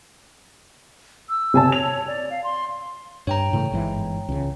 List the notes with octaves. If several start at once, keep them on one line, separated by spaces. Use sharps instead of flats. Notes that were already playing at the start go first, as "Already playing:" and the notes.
E6
C3 G#5 A5
C#5 F7
D5
F5
C6
G2 C#5 G5 A#5
A2 C#3 E3
G1 G#2 E3
C#2 C#3